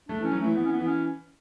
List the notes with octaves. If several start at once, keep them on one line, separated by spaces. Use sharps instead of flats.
A3 D4
E3 C#4
F#3
E3 A3
E3 B3
C#4
B3
E3
C#4